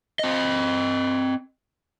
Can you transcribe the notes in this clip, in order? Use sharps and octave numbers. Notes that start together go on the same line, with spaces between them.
C4 D#5